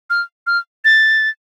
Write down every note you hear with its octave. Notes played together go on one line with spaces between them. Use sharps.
F6
F6
A6